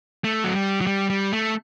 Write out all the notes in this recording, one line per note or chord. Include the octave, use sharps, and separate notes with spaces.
A3
F#3
G3
F#3
G3
G3
A3